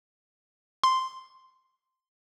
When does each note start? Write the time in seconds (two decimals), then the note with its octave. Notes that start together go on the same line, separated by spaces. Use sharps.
0.84 C6